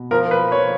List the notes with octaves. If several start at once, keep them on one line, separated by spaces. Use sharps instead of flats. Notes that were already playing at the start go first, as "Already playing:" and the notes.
Already playing: B2
F3 A#4
B4
F3 C#5